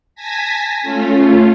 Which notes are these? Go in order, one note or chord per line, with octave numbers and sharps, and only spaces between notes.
G#5 A5 G#6 A#6 B6
A3 C#4 F4